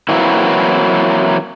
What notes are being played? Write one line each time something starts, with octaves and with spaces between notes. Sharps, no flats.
E3 F#3 A#3 C4 E4